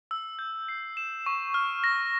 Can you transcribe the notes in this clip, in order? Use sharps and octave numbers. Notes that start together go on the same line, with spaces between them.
E6
G6
C7
E7
C#6
F6
A#6